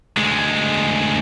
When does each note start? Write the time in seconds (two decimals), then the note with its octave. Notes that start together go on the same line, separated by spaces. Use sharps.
0.17 D2 G#3